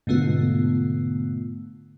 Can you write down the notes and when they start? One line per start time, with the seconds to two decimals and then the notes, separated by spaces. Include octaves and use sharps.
0.07 G#2 B2 D3 A3 B3 F4